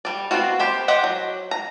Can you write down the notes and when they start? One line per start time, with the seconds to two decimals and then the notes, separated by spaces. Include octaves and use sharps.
0.05 G3 D5
0.31 B3 C4 F4 F#4
0.59 G4 C5 B5
0.88 G4 C5 D#5 F#5
1.04 F#3
1.51 A#5